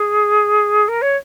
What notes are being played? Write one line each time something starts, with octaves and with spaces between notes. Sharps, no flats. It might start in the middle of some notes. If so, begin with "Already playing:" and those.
Already playing: G#4
A#4
C#5